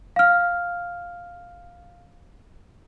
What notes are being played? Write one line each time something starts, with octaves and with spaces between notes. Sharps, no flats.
F5 F6